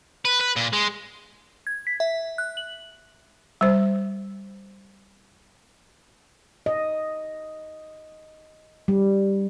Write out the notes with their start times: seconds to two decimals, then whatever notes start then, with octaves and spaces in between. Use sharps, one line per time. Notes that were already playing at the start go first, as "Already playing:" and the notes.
0.25 B4
0.41 B4
0.56 A#2
0.73 G#3
1.67 G#6
1.87 B6
2.00 E5
2.38 F#6
2.57 F#7
3.61 G3 C5
6.66 D#5
8.88 G3